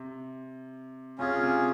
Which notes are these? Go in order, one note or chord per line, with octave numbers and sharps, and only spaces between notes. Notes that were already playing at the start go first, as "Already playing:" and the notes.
Already playing: C3
C3 C#4 F4 G#4
C3